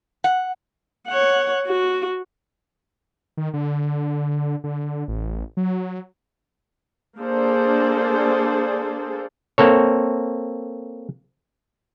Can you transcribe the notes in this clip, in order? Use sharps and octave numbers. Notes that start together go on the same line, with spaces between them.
F#5
C#5 F#5
F#4
D#3
D3
D3
A1
F#3
A#3 D4 G#4 A4 C5 D5
A#3 C4 A4 C#5